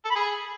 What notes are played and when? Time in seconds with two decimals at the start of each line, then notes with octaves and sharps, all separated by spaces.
0.05 A4
0.10 B5
0.16 G#4